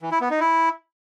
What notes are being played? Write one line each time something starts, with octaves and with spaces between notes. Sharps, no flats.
E3
E4
B3
D#4
E4